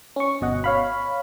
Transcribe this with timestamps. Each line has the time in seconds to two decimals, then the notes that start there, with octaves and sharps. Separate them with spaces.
0.16 C#4 C#6
0.41 G1 B2 D#5 F#5
0.64 C#5 F5 B5